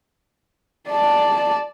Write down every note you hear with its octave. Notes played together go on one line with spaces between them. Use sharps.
D5 A5